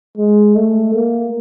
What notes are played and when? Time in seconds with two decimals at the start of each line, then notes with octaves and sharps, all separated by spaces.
0.17 G#3
0.55 A3
0.94 A#3